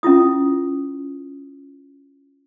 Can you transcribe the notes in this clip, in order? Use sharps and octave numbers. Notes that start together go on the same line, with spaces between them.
C#4 E4 F4 D#6